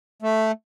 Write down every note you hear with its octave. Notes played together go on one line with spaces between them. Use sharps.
A3